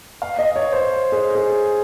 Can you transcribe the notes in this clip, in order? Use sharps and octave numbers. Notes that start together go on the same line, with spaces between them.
F5
D#5
C#5
C5
G#4
G#4